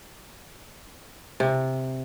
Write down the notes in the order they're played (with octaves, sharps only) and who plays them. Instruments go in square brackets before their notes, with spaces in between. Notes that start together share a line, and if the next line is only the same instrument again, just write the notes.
[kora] C3